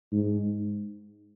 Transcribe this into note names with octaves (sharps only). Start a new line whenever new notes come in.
G#2